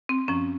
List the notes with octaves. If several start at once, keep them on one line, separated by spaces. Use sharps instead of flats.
C4
F#2 F3 C#4